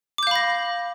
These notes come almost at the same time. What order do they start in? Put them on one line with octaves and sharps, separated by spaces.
D6 G6 F5 B5 A#6